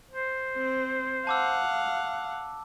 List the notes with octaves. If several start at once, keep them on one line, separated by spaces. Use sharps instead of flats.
C5
C4
F5 F#5 A5 D6 E6